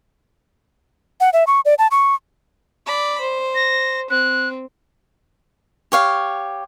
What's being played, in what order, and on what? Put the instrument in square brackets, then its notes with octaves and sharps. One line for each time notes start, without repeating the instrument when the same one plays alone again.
[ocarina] F#5
E5
C#6
D5
A5
C#6
[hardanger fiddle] D5 B5
C5
[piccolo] A#6
[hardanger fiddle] C4 [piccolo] F#6
[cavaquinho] G4 C#5 F5